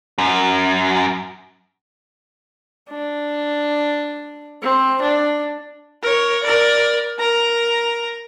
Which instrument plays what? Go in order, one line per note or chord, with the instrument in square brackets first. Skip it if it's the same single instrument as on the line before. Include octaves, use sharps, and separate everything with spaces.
[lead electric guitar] F#2
[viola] D4
C4
D4
[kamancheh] A#4 C#5
A#4 D5
A#4 A#5